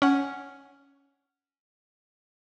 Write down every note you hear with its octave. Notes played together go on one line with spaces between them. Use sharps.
C#4 F#5